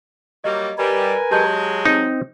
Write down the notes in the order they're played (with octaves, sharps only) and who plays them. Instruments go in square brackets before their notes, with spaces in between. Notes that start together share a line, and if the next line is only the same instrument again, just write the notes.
[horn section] F#3 G3 A#3 [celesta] D#5
[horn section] G3 [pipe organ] A#4 B4 G#5
[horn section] F#3 G#3 [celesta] G4 A5 G6
[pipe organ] C4 [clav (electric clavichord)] D#4